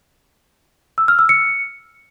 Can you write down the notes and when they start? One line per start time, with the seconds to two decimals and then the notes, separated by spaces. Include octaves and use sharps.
0.98 E6
1.08 F6
1.19 E6
1.29 C#7